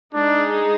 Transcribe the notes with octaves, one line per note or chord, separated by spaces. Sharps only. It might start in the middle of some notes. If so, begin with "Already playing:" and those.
G#3 D4 D#4 G#4